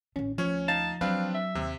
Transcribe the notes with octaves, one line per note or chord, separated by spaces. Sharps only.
A1 D#3 C#4
D2 F3 C#4 C#5
D#4 F5 A5 A6
F#3 C4 D4 B4 F5
E5
D#2 C3